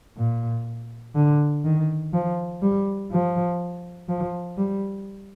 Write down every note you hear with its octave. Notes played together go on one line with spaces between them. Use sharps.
A#2
D3
D#3
F3
G3
F3
F3
G3